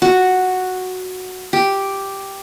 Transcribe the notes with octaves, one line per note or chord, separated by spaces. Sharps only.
F#4
G4